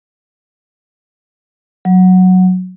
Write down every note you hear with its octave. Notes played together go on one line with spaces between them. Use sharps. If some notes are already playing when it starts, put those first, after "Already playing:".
F#3